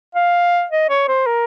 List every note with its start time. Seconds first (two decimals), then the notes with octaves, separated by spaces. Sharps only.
0.15 F5
0.71 D#5
0.90 C#5
1.08 C5
1.26 A#4